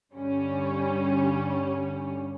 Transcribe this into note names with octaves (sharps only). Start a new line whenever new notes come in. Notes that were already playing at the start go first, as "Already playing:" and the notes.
G2 D3 G3 C#4